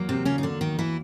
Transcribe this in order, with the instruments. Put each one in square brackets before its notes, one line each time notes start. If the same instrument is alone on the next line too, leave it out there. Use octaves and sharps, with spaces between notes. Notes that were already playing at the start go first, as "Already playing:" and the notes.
Already playing: [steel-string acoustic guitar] E2 F#3 A#3
C3 C4
C#3 C#4
D#4
D3 D4
D#3 D#4
E3 E4